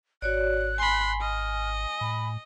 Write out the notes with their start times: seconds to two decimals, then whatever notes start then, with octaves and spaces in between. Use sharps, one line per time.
0.22 G#1 F#4 C#5 D5 F#6
0.78 G#5 B5 C6
1.21 D#5 F6
2.01 A2 B5